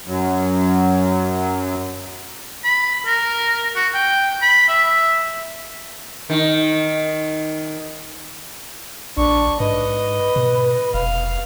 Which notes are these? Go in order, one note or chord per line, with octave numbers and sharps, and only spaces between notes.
F#2 F#3
B5
A#4
F#4
G5
B5
E5
D#3
A#1 D4 C#6
G#2 B4 D#5
B2
F1 F5